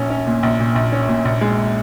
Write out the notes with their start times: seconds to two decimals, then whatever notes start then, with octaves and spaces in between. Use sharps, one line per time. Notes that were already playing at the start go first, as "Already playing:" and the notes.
Already playing: A#1 C#4
0.10 C#4
0.27 A#2
0.43 A#1
0.60 A#2
0.75 A#1
0.92 C#4
1.08 A#2
1.25 A#1
1.41 G#3